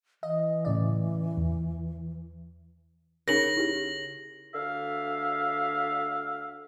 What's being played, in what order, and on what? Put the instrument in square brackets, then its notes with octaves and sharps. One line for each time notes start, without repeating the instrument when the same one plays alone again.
[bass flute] E3 [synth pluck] D#5
[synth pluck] A2 C#3 D5
E2
[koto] C#3 [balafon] D#4 A#4 [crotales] A#6 F#7
[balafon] E4 G4
[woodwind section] D2 D3 E5 F5